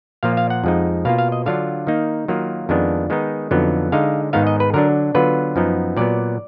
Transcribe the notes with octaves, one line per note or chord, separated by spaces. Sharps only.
A#2 F3 A#3 F4 F5
F5
F#5
F2 F3 G#3 D#4
B2 A#3 F4 F5
F5
D#5
D3 F#3 D4 F4 F5
D#3 A#3 D#4
D#3 F#3 A#3 F4
F2 D#3 G#3 B3 D4
D#3 G#3 B3 D#4
F2 D3 F#3 B3 D#4
D3 G#3 D#4 F5
G#2 D#3 G#3 B3 D#4 F5
D#5
B4
D3 F#3 D4 A#4
D3 F#3 B3 F4 B4
F#2 F3 B3 D#4
A#2 F#3 B3 D5